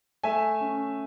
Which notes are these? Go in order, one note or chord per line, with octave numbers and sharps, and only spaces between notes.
A3 E5 G#5
C#4